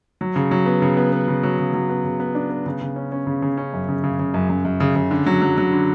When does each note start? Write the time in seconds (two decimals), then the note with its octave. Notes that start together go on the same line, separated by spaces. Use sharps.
0.21 F#3
0.36 C#3
0.51 F#3
0.66 B3
0.82 C#3
0.97 B3
1.12 B3
1.28 C#3
1.43 F#3
1.58 C#3
1.73 F#3
1.89 B3
2.04 C#3
2.20 B3
2.35 D4
2.50 B3
2.66 C#3
2.81 C#3
2.96 C#4
3.12 C#4
3.27 C#3
3.42 C#3
3.57 C#4
3.73 F#2
3.88 C#3
4.04 C#3
4.19 C#3
4.34 F#2
4.49 F#2
4.65 F#2
4.80 C#3
4.96 C#3
5.11 D3
5.26 F#3
5.41 F#3
5.57 F#3
5.72 D3